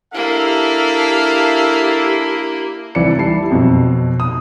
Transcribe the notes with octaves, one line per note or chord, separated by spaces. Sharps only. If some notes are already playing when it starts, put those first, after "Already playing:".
A#3 D4 E4 G4 A4 E5 F5
C2 E3 D5 C#7
G3 E4 A5 C7
F2 B2 F#3
D#6